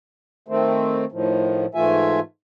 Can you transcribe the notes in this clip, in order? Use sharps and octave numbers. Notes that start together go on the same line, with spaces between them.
D#3 A3 C4
A2 D#3 F3
G#2 E3 A3 F4 E5 G#5